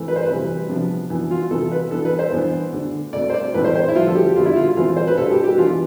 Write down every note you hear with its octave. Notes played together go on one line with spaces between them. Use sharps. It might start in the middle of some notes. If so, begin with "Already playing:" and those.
Already playing: E3 A3 C4
B4
C5
B4
C3 E3 G3
C3 F3 B3 D4
E3 B3 D4
F4
C3 E3 B3 A4
B4
E3 B3 D4 A4
B4
C5
E3 B3 D4
D3 A3 D4
B2 A3 C4 D5
C5
D5
A2 E3 A3 C4 B4
C5
C5
E4
D3 F3 B3 F4
A4
G4
D3 G3 B3 F4
E4
F4
E3 A3 C4 F4
C5
B4
B2 G3 D4 A4
G4
G4
E3 B3 D4 F4